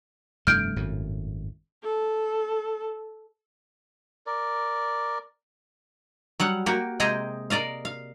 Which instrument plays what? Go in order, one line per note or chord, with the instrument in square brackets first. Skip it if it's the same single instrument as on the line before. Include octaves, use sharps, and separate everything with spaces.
[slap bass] F1 G2 A3 [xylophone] F6 G6 D7
[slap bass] G#1 F#2 A2
[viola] A4
[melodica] A#4 D5
[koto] F#3 G3 F#5
A#3 F#4 G4
C3 G#3 G4 G#4 D#5 A#5
A#4 D5 D#5 F5
F5